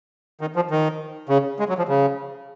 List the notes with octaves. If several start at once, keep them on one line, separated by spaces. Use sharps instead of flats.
D#3
F3
D#3
C#3
G#3
F#3
F3
C#3